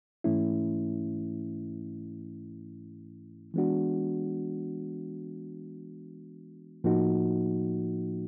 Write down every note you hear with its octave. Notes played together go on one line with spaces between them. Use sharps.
G#2 E3 A3 C#4 E4
E3 G#3 B3 D4 F#4
A2 F3 A#3 D#4 F#4